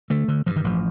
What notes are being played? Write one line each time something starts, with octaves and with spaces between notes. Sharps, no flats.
D3 A3
D3
G2 F3
D#3
A1 F3